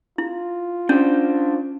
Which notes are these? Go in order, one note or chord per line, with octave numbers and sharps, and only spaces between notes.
E4 F4
C#4 D4 C5